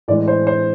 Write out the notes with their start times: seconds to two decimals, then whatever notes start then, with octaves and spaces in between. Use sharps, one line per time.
0.08 A2 E3 G#3 D5
0.28 C5
0.47 C5